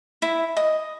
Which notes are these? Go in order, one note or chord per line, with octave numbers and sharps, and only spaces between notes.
E4
D#5